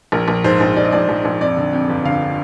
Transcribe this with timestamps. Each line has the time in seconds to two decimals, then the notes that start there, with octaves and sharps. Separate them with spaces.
0.12 A#1 A#4
0.28 A#1
0.44 G#2 C5
0.60 A#1
0.76 G#2 D5
0.84 D#5
0.92 A#1 D5
1.09 A#1
1.25 A#1
1.41 F2 D5
1.57 D3
1.73 F2
1.89 G1
2.05 D3 F5